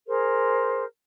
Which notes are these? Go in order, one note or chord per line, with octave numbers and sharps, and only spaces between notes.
G#4 A#4 C5